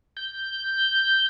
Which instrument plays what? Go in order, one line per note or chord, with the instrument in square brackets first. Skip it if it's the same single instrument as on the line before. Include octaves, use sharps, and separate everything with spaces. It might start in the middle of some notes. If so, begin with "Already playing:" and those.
[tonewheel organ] G6